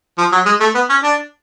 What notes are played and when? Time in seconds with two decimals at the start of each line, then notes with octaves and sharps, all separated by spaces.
0.18 F3
0.32 F#3
0.46 G#3
0.60 A3
0.75 B3
0.90 C#4
1.03 D4